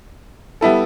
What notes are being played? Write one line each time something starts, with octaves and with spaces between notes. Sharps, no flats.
G3 B3 E4 A4